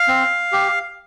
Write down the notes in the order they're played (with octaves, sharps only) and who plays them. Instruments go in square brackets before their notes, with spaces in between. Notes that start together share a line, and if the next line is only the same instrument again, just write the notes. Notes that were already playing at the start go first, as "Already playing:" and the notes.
Already playing: [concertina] F5
C4
G4